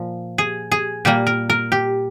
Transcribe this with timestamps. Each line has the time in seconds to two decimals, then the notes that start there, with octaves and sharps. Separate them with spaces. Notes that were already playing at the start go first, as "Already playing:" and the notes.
Already playing: A#2 F3
0.38 G#4
0.72 G#4
1.05 A#2 G3 A#3 G4
1.27 A#4
1.50 A#4
1.72 G4